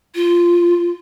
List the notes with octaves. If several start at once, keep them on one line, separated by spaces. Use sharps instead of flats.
F4